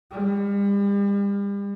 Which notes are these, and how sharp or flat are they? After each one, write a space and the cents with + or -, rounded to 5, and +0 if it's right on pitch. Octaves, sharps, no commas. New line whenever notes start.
G3 +40